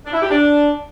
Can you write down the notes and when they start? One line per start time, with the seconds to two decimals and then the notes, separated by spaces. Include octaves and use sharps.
0.04 D4
0.12 E4
0.21 G4
0.29 D4